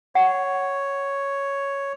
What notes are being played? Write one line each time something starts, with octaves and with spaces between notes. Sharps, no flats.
C#5 F#5